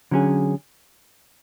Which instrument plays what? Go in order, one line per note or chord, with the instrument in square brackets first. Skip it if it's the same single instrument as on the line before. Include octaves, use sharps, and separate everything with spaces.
[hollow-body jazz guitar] D3 F#3 C#4 G#4